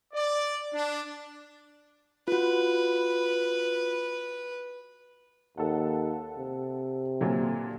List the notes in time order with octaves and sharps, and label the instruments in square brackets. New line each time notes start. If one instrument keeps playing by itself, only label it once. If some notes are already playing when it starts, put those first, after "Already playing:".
[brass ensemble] D5
D4
[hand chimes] F4 F#4 [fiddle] B4
[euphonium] D#2 [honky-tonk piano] A4 F#5
[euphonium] C3
[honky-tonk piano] A#2 D3 F#3